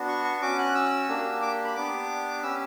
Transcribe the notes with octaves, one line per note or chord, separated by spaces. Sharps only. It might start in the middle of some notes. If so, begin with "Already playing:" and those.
Already playing: B3 D4 F#4
C#6
C#6
C#4 F#4 D6
F#6
E6
A#3 D4 G4
D6
B5
B3 D4 G4 D6
C#4 G4 E6